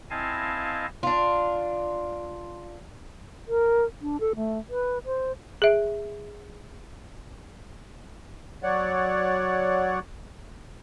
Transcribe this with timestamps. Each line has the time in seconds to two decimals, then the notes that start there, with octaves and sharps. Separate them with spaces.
0.10 C4 E4 D#5 F5 G#5 A5
1.03 D4 F4
3.48 A#4
4.02 D4
4.20 A4
4.36 A3
4.70 B4
5.05 C5
5.62 G#4 E5
8.63 F#3 C#5 D5 F#5